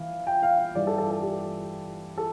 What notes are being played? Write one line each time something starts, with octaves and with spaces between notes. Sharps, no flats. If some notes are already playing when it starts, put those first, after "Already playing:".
Already playing: E3 F5
G5
F5
F5
G2 E3 G3 D5
A4
A4
A4
G4
A4